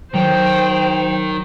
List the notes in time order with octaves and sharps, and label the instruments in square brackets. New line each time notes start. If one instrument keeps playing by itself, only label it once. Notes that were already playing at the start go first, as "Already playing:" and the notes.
[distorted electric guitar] D#3 [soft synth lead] F#3 [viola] C5 [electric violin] G5